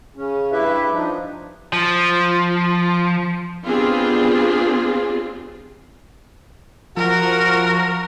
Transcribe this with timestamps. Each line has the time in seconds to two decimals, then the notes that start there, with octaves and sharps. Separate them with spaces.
0.16 C#3 C#4
0.52 G2 E4 G4 B4 E5
0.92 F3 D4 D#4
1.73 F3
3.66 B3 C4 D4 F4 G4 G#4
6.97 F3 F#4 A#4